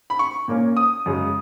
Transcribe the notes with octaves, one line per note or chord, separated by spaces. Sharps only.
B5
C#6
A#2 A#3 C#4
D#6
F#2 C#3 G#3